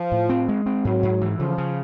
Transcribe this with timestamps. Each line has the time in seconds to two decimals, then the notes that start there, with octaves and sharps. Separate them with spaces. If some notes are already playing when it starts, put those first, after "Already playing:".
Already playing: F3
0.12 A2
0.29 C4
0.48 G#3
0.66 C4
0.85 G#2 F#3
1.03 G#2
1.21 E3
1.39 C#3 F3
1.58 C#3